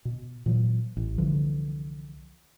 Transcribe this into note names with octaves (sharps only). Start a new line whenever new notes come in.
B2
A#2 E3 F#3
A1
C2 D3 E3 F3